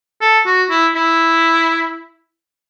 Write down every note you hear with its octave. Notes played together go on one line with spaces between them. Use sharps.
A4
F#4
E4
E4